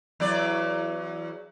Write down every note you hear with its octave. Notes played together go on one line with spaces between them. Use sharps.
E2 F#3 D5